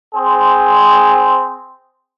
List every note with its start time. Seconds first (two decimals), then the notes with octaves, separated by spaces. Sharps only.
0.15 C4 G#4 C5